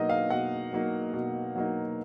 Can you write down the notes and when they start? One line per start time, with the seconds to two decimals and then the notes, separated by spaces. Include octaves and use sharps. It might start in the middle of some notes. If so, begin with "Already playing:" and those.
Already playing: B2 F#3 A#3 D#4 D#5
0.10 F5
0.30 B2 F#5
0.72 F#3 A#3 D#4
1.14 B2
1.55 F#3 A#3 D#4